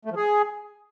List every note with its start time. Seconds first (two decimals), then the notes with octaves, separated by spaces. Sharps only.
0.05 A3
0.11 F3
0.16 G#4